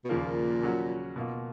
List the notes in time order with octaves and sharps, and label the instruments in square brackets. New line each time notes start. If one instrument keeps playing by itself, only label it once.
[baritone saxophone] B2
[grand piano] D#2 C#3 F3 A#3 [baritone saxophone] A#2
[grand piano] C#3 F#3 C#4 F#4
B2 A#3 F4